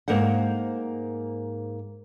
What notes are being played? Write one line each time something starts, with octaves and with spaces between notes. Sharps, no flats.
G#2 A#3 A#4 C5 F#5